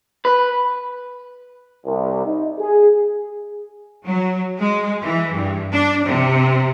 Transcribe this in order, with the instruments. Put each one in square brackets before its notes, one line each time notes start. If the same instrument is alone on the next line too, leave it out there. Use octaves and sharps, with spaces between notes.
[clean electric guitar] B4
[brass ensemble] C2
D#4
G#4
[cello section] F#3
G#3
E3
G2
D4
C3